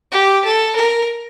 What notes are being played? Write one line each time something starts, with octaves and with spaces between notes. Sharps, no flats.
G4
A4
A#4